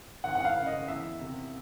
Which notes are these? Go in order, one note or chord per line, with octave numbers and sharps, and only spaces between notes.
G#1 F#5
F#5
F5
C#3
D#5
E2 E5
C3